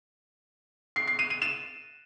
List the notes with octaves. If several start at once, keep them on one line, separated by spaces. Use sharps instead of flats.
C7
C7
D#7
D#7
E7